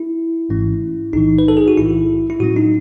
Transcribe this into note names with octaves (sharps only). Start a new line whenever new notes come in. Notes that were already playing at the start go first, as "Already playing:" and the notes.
Already playing: E4
G#1 G#2 E3 A3 C#4
B1 A2 E3 D#4
B4
A4
G#4
F#4
B1 A2 E3 E4
E4
A2 F#3 C#4 F#4
D#4